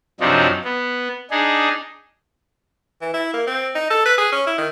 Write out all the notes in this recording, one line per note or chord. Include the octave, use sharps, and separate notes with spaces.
F#2 C3 F3 D4 D#4
B3
D4 D#4 G#4
E3
E4
A#3
C4
D#4
A4
B4
G#4
C#4
E4
D#3